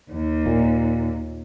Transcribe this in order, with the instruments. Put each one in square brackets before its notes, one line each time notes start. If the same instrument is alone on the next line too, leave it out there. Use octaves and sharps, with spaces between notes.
[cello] D#2
[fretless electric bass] A#2